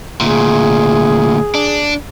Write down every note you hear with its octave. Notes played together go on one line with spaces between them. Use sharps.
D2 A#2 G#4
D4